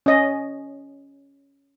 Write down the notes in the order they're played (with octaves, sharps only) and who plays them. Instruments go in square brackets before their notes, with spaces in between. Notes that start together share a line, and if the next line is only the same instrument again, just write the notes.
[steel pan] C#4 D#5